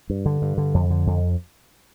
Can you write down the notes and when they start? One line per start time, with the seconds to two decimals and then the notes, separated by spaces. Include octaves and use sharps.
0.10 G2
0.26 D3
0.42 G2
0.58 D3
0.74 F2
0.90 D3
1.07 F2